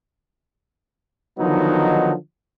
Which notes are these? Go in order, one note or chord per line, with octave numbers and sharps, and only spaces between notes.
D3 D#3 F3 F#3 B3 D#4